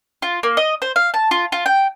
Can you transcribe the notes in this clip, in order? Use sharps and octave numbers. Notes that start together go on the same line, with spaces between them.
F4
A#3
D#5
C5
F5
A5
F4
F4
G5